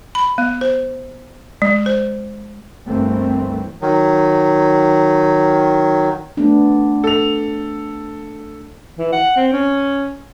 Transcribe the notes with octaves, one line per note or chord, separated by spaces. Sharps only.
B5
B3
C5
G#3
C5
G1 C2 E3 A3 A#3 C4
D#3 F#3
A3 B3 D4
A4 F7
E3
F#5
C4
C#4